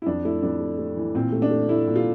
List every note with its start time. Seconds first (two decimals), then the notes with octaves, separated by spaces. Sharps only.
0.02 E4
0.06 F2 D4
0.25 A3 E4
0.43 F2 D4
0.61 A3
0.79 A3
0.97 E3
1.15 A#2 C4
1.32 A3
1.42 D4
1.51 A3
1.69 A3 E4
1.87 A#2
1.96 F4